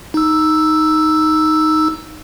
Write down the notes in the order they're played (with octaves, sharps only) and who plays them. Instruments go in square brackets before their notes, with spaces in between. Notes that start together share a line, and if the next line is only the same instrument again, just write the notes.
[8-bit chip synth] D#4 E6